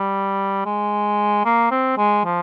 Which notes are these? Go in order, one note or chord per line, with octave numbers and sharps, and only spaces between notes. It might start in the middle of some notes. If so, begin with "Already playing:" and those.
Already playing: G3
G#3
A#3
C4
G#3
F3